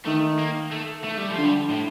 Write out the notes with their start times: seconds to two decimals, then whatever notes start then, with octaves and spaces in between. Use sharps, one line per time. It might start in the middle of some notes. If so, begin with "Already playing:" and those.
0.06 D#3 A3
0.39 A#3
0.71 A3
1.04 A3
1.18 G3
1.31 F3
1.38 D3
1.44 G3
1.70 A2